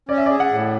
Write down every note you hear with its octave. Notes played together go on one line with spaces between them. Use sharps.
C#4 D5
E5
D5
G#4
F#5
A2